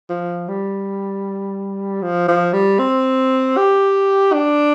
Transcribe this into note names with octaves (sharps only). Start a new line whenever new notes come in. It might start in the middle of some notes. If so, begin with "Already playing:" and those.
F3
G3
F3
F3
G3
C4
G4
D4